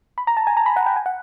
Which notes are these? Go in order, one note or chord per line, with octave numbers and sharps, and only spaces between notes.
B5
A#5
A5
G#5
A#5
B5
F#5
G5
G#5
F#5